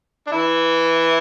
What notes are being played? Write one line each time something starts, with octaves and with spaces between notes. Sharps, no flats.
D4
E3 E4